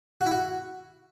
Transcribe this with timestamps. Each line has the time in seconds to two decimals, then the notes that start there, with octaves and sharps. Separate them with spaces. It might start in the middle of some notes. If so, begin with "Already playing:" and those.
0.21 F#4
0.26 E4
0.31 F#4